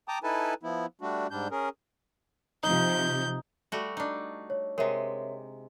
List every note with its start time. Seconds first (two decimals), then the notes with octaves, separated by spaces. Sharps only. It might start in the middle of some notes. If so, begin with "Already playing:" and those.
0.08 G5 A5 A#5 D6 D#6
0.23 D#4 E4 A4 B4 G#5 A5
0.63 F3 B3 E4
1.01 G3 A3 D4 F#4
1.31 G#2 G3 D4 G6
1.51 C#4 G#4 A#4
2.63 C3 F3 D#4 G6
3.72 G3 A3 F#4
3.97 D4 D#4
4.50 C#5
4.78 C3 G#3 A#4 C#5 E5